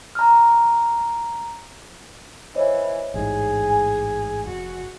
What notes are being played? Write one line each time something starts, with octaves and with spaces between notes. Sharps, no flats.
A#5 F6
E3 C5 C#5 D#5
A1 G#2 G#4
G#5
F1 F#4